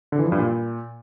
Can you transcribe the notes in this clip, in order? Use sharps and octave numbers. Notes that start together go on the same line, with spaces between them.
D3
E3
F3
G2
A#2